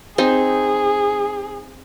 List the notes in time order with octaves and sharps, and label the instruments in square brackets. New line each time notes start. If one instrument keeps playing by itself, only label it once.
[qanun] C4 D#4 [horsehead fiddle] G#4